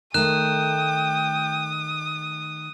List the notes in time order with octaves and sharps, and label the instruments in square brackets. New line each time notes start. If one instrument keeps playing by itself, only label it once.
[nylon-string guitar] D#3 A3 [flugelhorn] G5 [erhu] D#6 [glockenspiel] F#6 E7